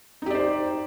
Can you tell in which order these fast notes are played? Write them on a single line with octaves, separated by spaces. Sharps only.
D#4 G4 D5 C5